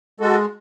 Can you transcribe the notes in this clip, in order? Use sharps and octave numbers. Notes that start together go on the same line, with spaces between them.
G#3 F#4 A4